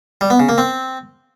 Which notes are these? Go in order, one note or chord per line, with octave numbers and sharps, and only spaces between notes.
G3
B3
C#3
A#3
C4